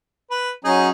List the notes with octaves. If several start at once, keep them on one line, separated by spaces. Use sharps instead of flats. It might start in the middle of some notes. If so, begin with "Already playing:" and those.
B4
F#3 C#4 D#4 G#4 A#5